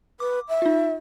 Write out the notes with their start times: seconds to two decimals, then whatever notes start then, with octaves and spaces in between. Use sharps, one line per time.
0.20 B4 D6
0.49 E5
0.62 D#4 F4